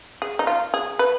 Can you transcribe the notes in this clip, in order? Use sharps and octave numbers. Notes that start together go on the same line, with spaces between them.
G#4
D#4
F4
G#4
B4